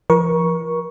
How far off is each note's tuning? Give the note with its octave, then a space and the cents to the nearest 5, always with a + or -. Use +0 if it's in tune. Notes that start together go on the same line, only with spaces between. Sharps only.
F3 -35 A#4 +35 C#6 +0